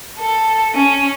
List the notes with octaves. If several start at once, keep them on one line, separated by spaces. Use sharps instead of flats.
A4
C#4